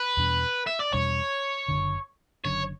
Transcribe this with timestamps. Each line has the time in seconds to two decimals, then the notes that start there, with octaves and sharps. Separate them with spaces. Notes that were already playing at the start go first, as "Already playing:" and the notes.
Already playing: B4
0.17 E2 B2 G3 D4
0.67 E5
0.80 D5
0.93 E2 B2 G3 D4 C#5
1.68 F#1 F#2 D3
2.45 F#1 F#2 D3 C#5